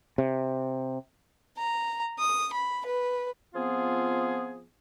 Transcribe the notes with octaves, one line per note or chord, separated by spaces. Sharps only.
C3
A#5
D#6
B5
B4
F3 B3 C4 F4 G#4